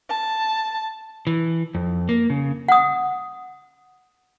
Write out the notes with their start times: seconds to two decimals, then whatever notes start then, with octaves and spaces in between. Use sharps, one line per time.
0.10 A5
1.27 E3
1.75 F2
2.09 A#3
2.30 C#3
2.68 F#5 D#6